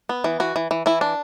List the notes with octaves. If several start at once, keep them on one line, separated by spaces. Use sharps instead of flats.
B3
E3
E3 F#4
E3
E3
E3 E4
D4